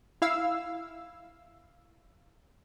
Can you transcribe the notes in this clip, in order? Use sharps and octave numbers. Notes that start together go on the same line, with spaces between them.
E4 F5 E6